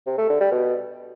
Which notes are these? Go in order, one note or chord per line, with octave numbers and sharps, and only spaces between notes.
C3
A3
D3
G3
B2